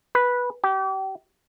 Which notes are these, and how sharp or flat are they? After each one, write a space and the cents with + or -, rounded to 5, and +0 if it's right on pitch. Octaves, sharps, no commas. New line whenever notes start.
B4 -10
G4 -35